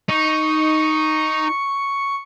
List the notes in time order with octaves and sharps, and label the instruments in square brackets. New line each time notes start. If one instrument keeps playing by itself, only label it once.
[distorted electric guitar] D#4 [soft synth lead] C#6